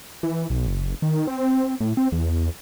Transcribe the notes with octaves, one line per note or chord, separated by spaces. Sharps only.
E3
B1
F#1
D#3
C4
A2
C4
E2